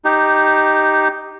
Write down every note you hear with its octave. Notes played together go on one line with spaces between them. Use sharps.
D#4 G4